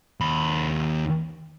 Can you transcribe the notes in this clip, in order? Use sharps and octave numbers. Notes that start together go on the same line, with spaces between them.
D#2 B5